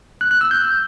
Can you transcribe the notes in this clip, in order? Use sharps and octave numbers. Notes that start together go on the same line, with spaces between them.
F#6
F#6
E6
G6